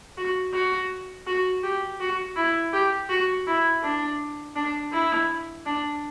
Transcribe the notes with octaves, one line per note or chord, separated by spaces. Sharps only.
F#4
F#4
F#4
G4
F#4
E4
G4
F#4
E4
D4
D4
E4
D4